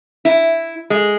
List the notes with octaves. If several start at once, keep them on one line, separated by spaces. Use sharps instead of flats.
E4
G#3